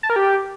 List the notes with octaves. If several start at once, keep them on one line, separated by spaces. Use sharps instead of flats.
A5
A#4
G4